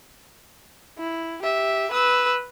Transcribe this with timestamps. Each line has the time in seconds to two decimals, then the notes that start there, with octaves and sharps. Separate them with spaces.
0.99 E4
1.43 G4 E5
1.92 B4 E6